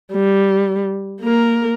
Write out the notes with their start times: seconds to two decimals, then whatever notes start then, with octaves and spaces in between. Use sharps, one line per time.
0.13 G3
1.21 A#3 A#4